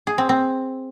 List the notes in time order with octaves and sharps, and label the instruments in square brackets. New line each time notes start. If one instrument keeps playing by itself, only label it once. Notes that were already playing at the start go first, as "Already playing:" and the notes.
[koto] G#4
C4
C4